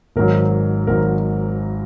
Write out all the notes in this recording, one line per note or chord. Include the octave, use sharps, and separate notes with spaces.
G#1 G#2 F#3 A#4
G#1 G#2 F#3 A#4